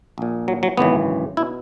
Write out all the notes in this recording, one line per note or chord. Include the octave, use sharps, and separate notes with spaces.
A#1 A#2
F#3
F#3
G#1 F#2 C#3 E3 B3
B2 E4